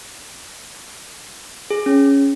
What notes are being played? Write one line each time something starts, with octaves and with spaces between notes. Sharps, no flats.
G#4
C#4